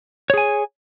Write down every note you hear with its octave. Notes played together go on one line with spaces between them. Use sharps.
G#4 C#5 G#5